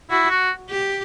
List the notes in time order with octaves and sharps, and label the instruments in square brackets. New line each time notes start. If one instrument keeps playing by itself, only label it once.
[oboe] E4 [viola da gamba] F#4
[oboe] F#4
[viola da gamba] G4